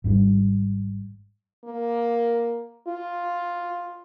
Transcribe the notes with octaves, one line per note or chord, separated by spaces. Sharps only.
G#1 G#2 G3
A#3
F4